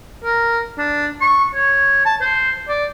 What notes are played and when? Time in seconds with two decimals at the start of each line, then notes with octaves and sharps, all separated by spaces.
0.24 A#4
0.78 D4
1.21 C#6
1.55 C#5
2.06 A5
2.21 C5
2.68 D5